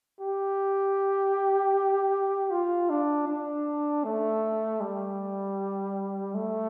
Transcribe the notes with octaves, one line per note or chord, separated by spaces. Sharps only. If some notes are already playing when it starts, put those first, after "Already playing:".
G4
F4
D4
D4
A3
G3
A3